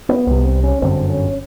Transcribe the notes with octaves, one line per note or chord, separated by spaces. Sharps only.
B3
C2 C3 B3
C4
C#4
G1 F#2 D3 C4
C#4